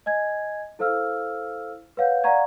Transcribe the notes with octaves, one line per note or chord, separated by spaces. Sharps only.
D#5 G#5 G#6
E4 A4 C5 F5 E6 F6
B4 C#5 F5 F#5 G6
D5 F5 F#5 A#5 C#6 G#6